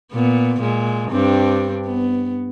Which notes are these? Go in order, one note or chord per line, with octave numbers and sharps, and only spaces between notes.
A#2 B3
A#2 G#3
G2 C4 D4
B3